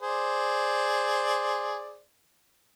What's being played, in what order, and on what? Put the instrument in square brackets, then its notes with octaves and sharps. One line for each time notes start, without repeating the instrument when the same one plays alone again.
[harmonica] G#4 C5 D5